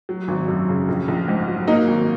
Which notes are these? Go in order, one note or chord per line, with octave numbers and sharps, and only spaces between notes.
F#3
G#1
F#2
C#3
A#1
A#1
G#2
F#3
F#3 A#3 D#4
G#1